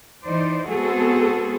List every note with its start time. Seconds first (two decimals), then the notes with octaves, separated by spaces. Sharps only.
0.24 E3 D#4 C5 D5
0.70 G#3 B3 C4 F#4 G#4 A4